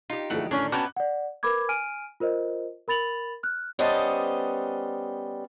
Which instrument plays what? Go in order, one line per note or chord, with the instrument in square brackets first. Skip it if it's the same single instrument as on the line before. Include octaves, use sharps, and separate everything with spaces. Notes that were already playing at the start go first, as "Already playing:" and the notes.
[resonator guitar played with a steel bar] D#4 G4 [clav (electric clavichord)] F4
[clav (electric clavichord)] D2 A3 F#5 [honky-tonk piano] E3 F3 G#4
[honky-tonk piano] A2 [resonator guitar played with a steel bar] D3 D#3 [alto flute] C#4 [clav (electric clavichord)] D4
[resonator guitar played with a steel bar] B3 C#4 [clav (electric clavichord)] F#4 G5 A#5 [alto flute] A5 [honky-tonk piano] D6 F#6
[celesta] D5 F#5
A#4 B4 B5 D6 G#6
G#5 F6 D7 D#7
F4 A#4 C5 D#5
A#4 B5 A6 F7 F#7
F6 F#6
[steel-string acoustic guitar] G3 B3 C#4 C5 D#5 A5